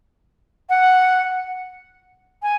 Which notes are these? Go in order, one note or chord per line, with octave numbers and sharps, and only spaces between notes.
F#5
G#5